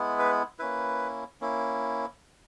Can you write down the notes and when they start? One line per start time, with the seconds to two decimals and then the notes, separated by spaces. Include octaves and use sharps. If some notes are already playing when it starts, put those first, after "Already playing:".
Already playing: G#3 B3 E4
0.19 B4
0.59 A#3 C#4 E4 B4
1.41 A#3 C#4 E4